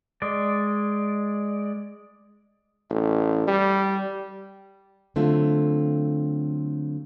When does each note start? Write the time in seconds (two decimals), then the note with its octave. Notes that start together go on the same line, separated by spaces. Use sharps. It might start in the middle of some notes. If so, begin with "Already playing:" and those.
0.22 G#3 D5
2.90 A1
3.47 G3
5.16 D3 F#3 A3 C4 F4